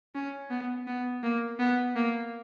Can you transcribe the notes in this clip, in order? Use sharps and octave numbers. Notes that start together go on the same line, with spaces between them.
C#4
B3
B3
A#3
B3
A#3